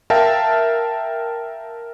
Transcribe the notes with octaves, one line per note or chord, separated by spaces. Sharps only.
A#4 E5 F5 G5 A5